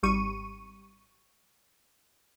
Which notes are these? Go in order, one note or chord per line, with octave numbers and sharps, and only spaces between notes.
G#1 G3 C#6 D#7